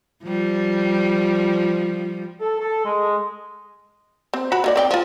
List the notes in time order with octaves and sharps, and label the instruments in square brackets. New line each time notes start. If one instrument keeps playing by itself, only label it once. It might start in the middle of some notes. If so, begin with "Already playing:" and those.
[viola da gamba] F3 G3
[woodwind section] A4
A4
G#3
[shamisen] C4
F#4 B5
D#3 A#3 D5
C4 D5 G5
F3 F4